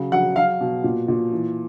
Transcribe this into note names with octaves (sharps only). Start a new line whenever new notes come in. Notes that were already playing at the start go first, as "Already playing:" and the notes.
Already playing: C#3 F#3
F#3 F#5
F#3 F5
B2
A#2
A#2
E3